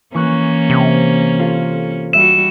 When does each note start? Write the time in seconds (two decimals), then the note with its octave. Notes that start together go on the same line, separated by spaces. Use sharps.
0.14 E3 A#3 C#4 C#6 F#6
0.70 C3
1.39 F4 A4 F5
2.13 G3 F#4 E5 E7